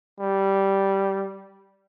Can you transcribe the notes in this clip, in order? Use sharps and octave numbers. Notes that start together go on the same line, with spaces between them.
G3